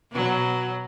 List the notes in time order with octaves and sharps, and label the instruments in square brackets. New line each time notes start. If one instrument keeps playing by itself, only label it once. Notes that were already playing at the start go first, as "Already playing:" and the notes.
[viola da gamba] B2 F#3